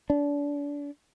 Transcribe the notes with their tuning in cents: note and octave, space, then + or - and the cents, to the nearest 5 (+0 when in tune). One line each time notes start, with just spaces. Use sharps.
D4 -30